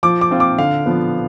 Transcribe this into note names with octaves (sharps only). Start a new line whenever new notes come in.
F3 D6
D6
C4 F4
D6
D3 F5
F3 B3